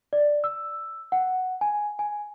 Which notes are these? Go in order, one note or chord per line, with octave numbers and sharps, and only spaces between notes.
D5
E6
F#5
G#5
G#5